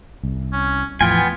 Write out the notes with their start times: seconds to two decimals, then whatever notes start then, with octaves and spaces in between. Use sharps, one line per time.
0.23 C2
0.53 C#4
1.01 E2 A2 F3 B3 F4 G5 G#5